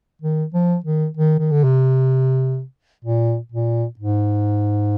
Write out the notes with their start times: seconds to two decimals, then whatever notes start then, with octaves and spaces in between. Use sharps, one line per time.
0.22 D#3
0.54 F3
0.84 D#3
1.17 D#3
1.39 D#3
1.51 D3
1.64 C3
3.05 A#2
3.52 A#2
3.99 G#2